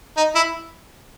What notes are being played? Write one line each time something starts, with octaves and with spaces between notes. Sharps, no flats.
D#4
E4